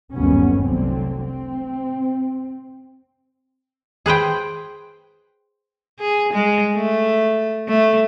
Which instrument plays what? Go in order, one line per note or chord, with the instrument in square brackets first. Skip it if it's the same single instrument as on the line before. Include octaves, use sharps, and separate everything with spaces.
[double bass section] G1 D#2 F#3 B3 C#4
F1 C2 D3 F#3 C4
C4
[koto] G#4 B4 C5 G5
[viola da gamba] G#4
G#3
A3
A3